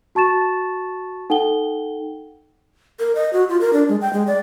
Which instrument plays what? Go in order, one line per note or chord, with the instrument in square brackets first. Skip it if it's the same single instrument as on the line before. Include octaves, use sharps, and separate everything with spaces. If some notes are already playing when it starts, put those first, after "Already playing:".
[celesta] F#4 A5 C#6 A6 E7
D#4 A4 F#5 G5 G7
[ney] A#4
D#5
F#4
F4
A#4
D4
G#3
G5
G#3
D5